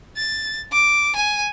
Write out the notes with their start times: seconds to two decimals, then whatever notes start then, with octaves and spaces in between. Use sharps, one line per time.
0.17 A6
0.72 D6
1.16 G#5